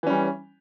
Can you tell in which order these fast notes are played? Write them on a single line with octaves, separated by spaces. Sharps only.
E3 C#4 G3